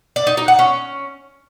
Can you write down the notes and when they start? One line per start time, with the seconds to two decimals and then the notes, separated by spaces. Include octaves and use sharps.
0.16 D5
0.27 D#4
0.37 D#4
0.48 F#5
0.59 C#4